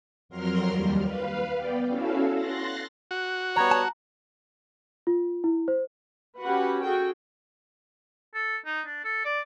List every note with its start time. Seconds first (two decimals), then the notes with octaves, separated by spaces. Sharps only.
0.29 F2 F#3 A#4 C6 F6
0.67 D#2 G3
1.05 B4 F5
1.56 B3 D5 G5
1.89 C#4 E4 F#4 A4 E5 F5
2.32 C6 F#6 A6 A#6
3.11 F#4
3.56 G3 B3 C#5 A#5
3.71 A5
5.07 F4
5.44 E4
5.68 C5
6.41 C#4 F#4 G4 B4 F#5
6.83 F#4 G#4 A4 G5
8.34 A4
8.66 D#4
8.87 D4
9.04 A4
9.25 D5